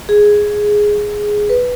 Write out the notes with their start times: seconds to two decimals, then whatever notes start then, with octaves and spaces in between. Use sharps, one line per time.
0.09 G#4
1.49 B4